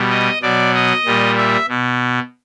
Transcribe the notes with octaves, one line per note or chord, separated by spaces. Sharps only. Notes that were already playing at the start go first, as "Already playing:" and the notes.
Already playing: B2 G3
D#5
B2 F#3 D5
D#5
A#2 G3
E5
B2